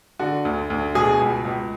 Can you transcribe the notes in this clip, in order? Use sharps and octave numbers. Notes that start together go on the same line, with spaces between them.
D3 F#4
D2
D2
B2 G#4
C#2
C#2